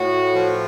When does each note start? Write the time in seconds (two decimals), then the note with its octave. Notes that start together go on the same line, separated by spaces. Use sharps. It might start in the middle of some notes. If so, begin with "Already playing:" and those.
Already playing: A2 F#4
0.33 F3